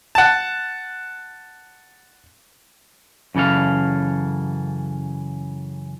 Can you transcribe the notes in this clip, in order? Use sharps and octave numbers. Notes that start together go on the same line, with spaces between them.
F#5 A5
F#2 C#3 E3 A4 F5